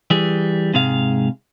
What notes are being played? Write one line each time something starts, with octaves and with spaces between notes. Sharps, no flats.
E3 G3 G#4
G#2 C3 G#3 G#4 F5